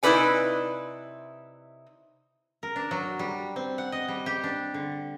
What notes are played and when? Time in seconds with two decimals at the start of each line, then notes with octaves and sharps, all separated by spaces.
0.03 C3 D#4 E4 B4 D5 G#5
2.63 A#4
2.76 D4
2.91 F#3
3.19 G3
3.56 C4
3.78 F#5
3.92 D#5
4.08 G3
4.26 G4
4.44 D4
4.74 D3